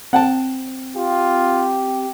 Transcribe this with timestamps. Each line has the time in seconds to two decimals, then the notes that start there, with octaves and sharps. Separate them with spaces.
0.13 C4 F#5 G5 A5
0.96 F4 G4